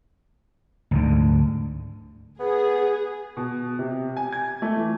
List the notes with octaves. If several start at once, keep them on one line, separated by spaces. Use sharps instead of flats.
D2 G#2 D3
B3 G#4
B2
C3
G#5
G#6
A3
E3